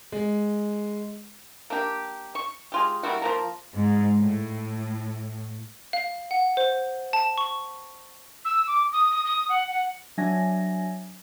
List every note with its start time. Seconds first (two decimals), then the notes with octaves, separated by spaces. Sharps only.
0.12 G#3
1.70 A#3 D4 G4
2.35 C#6
2.72 G#3 F4 G4
3.03 G3 A#3 E4 F#4
3.22 F3 A#3 A#5
3.75 G#2
4.18 A2
5.93 F5
6.31 F#5
6.57 C5
7.13 A5
7.38 C#6
8.45 E6
8.67 D6
8.92 D#6
9.11 D#6
9.25 D#6
9.49 F#5
9.71 F#5
10.17 F#3 D4 E5 G#5 G#6 A#6